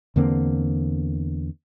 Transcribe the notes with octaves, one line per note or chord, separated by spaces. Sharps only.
E2 D3 A#3 C4